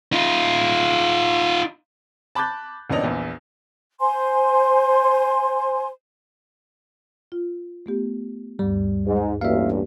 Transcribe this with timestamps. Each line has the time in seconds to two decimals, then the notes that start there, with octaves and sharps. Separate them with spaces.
0.13 D#4 F4
2.35 A5 B5 D6 F#6 G6 A6
2.90 D#1 E2 C#4 D4 D#5 F7
3.04 A#1 E2
4.00 C5 G#5 C6
7.32 F4
7.86 A3 B3 G4
8.59 D2 G2 G3
9.07 G#2
9.41 A1 G2 A#3 F#4 E5 F5